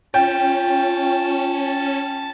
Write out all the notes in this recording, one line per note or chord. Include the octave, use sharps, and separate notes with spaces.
C#4 F4 G5 A5